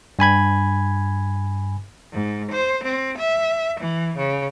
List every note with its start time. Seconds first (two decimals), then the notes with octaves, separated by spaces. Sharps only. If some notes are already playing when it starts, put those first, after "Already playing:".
0.19 G2 G#5 B5 G#6
2.12 G#2
2.51 C5
2.83 C4
3.19 E5
3.79 E3
4.17 C#3